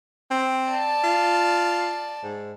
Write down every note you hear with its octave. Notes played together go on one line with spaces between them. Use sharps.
C4
D5 A5
F4
G#2